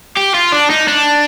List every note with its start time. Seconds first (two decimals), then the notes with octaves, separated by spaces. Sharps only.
0.17 G4
0.35 F4
0.52 D4
0.70 D#4
0.88 D4